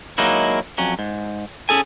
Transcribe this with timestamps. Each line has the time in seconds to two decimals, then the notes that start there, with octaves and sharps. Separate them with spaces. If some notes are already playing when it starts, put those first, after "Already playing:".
0.18 F#3 G#3 A#3 D#4 E4
0.78 F2 F#3 C#4
0.99 G#2
1.69 C#4 G#4 A4 G#5